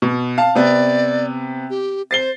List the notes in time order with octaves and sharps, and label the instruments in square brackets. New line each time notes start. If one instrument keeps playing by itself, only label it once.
[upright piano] B2
F5 A5
[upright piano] C3 B3 [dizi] D5
[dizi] G4
[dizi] C5 [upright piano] A6 C7 G7